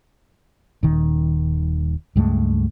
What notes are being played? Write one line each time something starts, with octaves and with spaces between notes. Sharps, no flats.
D#1 D#3
C#2 G2 G#3 A3